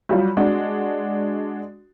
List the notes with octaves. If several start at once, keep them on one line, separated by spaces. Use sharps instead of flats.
F#3 G3 F4
G#3 D4 F#4